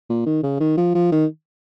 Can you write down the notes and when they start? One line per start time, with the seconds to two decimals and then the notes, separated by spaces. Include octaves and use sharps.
0.10 A#2
0.26 D#3
0.43 C#3
0.60 D#3
0.77 F3
0.95 F3
1.12 D#3